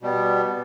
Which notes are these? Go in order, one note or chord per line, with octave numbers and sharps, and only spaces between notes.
B2 G3 B3